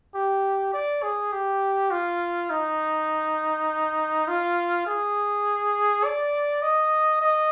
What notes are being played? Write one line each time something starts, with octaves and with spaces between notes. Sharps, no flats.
G4
D5
G#4
G4
F4
D#4
F4
G#4
D5
D#5
D#5